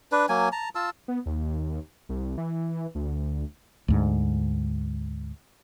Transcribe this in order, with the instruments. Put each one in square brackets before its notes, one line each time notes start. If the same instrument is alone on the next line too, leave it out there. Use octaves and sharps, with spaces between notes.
[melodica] D4 B4
F#3 A#3 G#5
A5 A#5
F4 A5 E6
[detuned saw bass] B3
D#2
C2
E3
D2
[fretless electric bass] D2 G#2